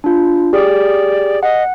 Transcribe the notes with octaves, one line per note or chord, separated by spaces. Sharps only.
D4 F4
G4 G#4 D5
D#5 F#5